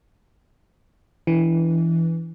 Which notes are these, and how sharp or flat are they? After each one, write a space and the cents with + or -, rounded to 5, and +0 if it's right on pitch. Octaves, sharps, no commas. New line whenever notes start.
E3 +0 D4 -45